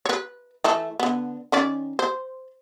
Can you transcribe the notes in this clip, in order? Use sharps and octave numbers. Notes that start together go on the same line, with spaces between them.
B4 C#5
E3 A3 A4
D3 B3
D#3 C#4 D5
C5